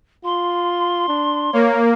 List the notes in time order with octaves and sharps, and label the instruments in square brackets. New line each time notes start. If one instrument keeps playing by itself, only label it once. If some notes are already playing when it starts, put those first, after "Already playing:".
[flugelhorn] F4 [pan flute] C6
[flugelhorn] D4
[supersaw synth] A#3 [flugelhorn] C#5